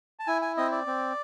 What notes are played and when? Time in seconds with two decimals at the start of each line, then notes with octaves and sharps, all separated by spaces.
0.20 A5
0.27 E4 G#5
0.42 G#5
0.57 C4 D#5
0.72 D5
0.87 C4